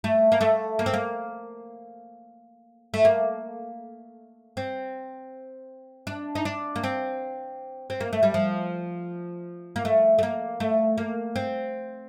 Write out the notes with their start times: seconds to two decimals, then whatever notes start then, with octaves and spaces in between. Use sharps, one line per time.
0.04 A3
0.32 A#3
0.41 A3
0.79 A#3
0.86 C4
0.94 A#3
2.94 A3
3.05 A#3
4.57 C4
6.07 D4
6.35 D#4
6.45 D4
6.76 A#3
6.84 C4
7.90 C4
8.00 A#3
8.13 A3
8.23 G3
8.34 F3
9.76 A#3
9.85 A3
10.18 A3
10.23 A#3
10.60 A3
10.98 A#3
11.36 C4